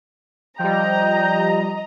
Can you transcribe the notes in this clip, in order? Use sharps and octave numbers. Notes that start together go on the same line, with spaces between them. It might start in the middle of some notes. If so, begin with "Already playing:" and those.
F3 G3 D#5 G5 A#5